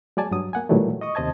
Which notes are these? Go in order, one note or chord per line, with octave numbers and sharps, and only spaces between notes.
F#3 G#3 D5 G#5 A5
G2 F#3 D#6
A#3 F#5 G#5
A#2 D#3 E3 F#3 G3 A3
D#5 C#6 D#6
D#2 C3 C5 D#5 A5 G#6